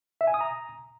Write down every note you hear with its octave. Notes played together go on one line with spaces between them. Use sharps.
E5
G#5
D#6
A#5